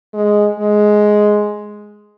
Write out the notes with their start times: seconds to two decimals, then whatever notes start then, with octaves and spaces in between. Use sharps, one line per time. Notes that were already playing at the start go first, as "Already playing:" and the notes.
0.14 G#3
0.60 G#3